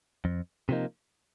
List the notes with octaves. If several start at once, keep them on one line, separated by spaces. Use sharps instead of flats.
F2
C3 F3 A#3 D#4